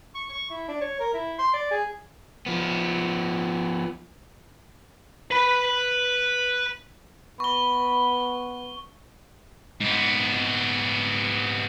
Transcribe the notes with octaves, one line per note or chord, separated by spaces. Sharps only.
C#6
C#6
E4
D4
C#5
A#4
E4
C6
D5
G#4
F3 B3
B4 B5
B3 B5 C#6 G7
G#2 B3